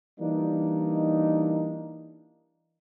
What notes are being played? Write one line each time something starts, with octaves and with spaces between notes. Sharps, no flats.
E3 G3 A#3 D4 D#4